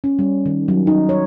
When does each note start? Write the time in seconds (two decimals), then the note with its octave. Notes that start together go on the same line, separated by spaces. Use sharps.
0.04 C#4
0.19 G3
0.46 D#3
0.68 F#3
0.87 D#4
1.09 C#5